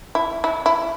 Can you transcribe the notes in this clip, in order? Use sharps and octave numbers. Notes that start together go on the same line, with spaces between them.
E4
E4
E4